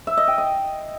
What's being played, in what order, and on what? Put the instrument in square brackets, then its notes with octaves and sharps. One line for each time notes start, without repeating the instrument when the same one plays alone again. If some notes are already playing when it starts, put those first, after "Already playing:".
[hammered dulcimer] E5
D#5
G5
D#5